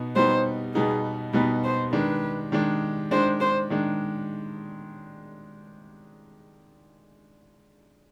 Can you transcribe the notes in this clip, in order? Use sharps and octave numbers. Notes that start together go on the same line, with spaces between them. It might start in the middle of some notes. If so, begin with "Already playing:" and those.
Already playing: B2 B3 D#4
B2 G3 B3 D#4 C5
B2 G3 B3 D#4 G#4
B2 G3 B3 D#4 B4
C5
D#3 G#3 D4 B4
D#3 G#3 D4
D#3 G#3 D4 C5
C5
D#3 G#3 D4